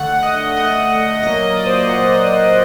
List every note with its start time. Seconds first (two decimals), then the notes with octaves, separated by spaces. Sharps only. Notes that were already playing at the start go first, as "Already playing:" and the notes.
Already playing: D3 A3 F#5
0.23 D#5
0.57 D3 A3 D#5
1.23 A#2 F#3 A#3 D#5
1.56 D5
1.66 C5
1.77 D5
1.88 A#2 F#3 A#3 F#5